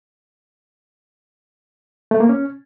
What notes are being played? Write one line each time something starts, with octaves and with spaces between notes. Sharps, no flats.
A3
A#3
C#4